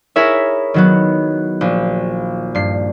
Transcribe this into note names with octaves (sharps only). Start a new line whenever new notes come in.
E4 G#4 A#4 C#5 E5
D#3 F#3 B3
A#1
G2 C7